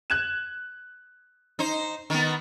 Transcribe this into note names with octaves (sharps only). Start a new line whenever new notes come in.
F#6 G#6 E7
D#4 C5
D#3 B3